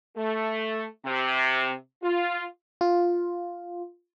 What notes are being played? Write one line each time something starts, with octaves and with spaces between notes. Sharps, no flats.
A3
C3
F4
F4